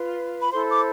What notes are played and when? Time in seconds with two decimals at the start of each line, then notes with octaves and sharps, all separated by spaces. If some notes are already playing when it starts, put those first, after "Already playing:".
Already playing: F4 B4
0.39 B5
0.51 E4 A4 C5 C6
0.68 D6